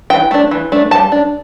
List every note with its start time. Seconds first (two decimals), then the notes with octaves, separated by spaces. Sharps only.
0.10 E3 G5
0.31 A3 D4
0.51 E3
0.72 A3 D4
0.91 G3 A5
1.12 D4